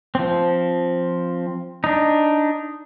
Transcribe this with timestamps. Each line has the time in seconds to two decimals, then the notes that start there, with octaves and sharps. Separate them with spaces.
0.15 F3 C4
1.84 D4 D#4